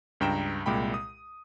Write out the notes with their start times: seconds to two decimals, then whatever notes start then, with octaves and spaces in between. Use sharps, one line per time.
0.20 C#2 G2 G5 A#5 E7
0.66 C2 A#2 G#3 G5 B5
0.94 D#6